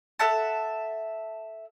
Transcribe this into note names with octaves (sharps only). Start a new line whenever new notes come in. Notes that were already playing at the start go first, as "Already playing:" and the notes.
A4 E5 F#5 A5